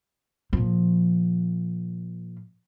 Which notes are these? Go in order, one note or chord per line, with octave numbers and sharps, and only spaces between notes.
A#2 F3